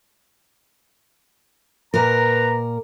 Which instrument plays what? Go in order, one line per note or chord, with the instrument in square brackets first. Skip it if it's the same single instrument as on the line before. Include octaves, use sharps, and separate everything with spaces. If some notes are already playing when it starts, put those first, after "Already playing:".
[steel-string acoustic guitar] A#2 A#4 [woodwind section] B4 A#5